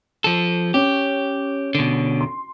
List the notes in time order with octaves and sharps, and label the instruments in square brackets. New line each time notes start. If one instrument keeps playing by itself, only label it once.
[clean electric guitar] F3 A4
[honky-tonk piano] C#4 [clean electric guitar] G4
[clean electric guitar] B2 D3
[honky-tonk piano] C6